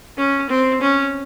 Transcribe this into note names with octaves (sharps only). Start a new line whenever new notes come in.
C#4
C4
C#4